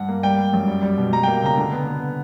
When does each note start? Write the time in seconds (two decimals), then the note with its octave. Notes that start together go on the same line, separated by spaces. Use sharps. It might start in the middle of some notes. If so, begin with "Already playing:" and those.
Already playing: G2 F#5
0.09 A#3
0.23 G3 G5
0.38 G3
0.53 F#2
0.68 G3
0.82 G3
0.98 B2
1.12 G3 A#5
1.23 A#3 G5
1.42 C#3 A#5
1.58 D3
1.72 B3
1.87 B3